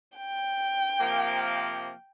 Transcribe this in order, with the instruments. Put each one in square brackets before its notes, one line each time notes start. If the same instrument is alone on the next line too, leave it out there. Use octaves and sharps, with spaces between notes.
[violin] G5
[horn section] C3 F3 A#3